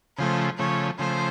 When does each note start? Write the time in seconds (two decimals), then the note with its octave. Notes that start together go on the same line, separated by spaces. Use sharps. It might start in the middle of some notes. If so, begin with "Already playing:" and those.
0.18 C#3 F3 A3 C5
0.58 C#3 F3 A3 C#5
0.98 C#3 F3 A3 C5